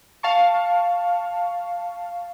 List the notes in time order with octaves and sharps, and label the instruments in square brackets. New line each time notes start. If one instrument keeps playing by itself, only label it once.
[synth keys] F5 A5 C#6